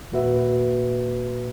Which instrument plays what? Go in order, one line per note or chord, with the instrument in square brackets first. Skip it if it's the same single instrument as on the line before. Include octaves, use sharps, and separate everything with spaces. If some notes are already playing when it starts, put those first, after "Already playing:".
[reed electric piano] D#2 A#2 A#3 F#4 B4 E5